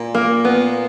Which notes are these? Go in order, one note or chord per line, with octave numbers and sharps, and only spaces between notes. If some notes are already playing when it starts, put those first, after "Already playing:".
Already playing: A#2
A#3
B3